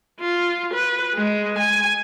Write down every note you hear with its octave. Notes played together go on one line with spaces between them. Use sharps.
F4
B4
G#3
G#5